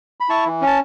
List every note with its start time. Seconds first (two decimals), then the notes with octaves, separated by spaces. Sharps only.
0.20 B5
0.29 E4 A5 C#6
0.46 E3
0.61 C#4
0.67 A5